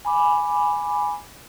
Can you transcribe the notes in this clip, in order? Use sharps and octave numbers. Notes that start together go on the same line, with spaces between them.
G#5 B5 D6